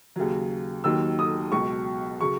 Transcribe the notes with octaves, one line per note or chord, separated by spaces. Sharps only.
D#2 C#3 F#3
D#2 D#3 F#3 E6
D#6
C#2 B2 F#3 C#6
C#3 F#3 C#6